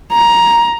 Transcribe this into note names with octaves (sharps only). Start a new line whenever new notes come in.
A#5